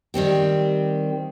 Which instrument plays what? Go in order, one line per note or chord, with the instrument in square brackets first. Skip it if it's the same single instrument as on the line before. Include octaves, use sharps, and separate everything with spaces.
[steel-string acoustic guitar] D#3 G3 C4 G4